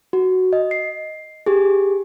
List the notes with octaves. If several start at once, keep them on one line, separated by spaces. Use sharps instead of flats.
F#4
D#5
C7
G4 G#4